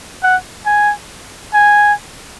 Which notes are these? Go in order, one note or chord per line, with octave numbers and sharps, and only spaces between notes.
F#5
G#5
G#5